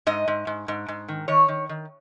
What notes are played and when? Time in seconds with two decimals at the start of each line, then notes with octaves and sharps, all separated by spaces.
0.07 G#2 D#5
0.28 G#2
0.47 G#2
0.68 G#2
0.88 G#2
1.08 D#3
1.28 D#3 C#5
1.48 D#3
1.69 D#3